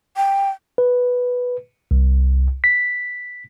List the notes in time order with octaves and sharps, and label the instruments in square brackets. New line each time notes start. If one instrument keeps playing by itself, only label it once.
[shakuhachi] G5
[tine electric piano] B4
C2
B6